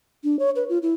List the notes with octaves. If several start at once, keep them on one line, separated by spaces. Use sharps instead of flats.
D4
C#5
B4
F4
E4